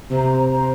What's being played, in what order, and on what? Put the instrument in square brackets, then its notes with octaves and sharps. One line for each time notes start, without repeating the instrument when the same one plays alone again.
[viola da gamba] C3 [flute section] C5 A#5
[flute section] C5 A#5